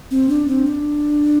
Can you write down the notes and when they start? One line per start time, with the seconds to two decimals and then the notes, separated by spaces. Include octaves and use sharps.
0.11 C4
0.29 D4
0.47 C4
0.65 D4